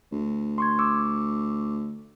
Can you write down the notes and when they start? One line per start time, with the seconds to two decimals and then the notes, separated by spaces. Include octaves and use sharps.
0.12 D2
0.58 C6 C#6 G#6
0.79 C#6 D6 E6